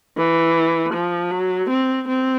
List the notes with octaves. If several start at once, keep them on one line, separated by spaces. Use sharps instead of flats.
E3
F3
F#3
C4
C4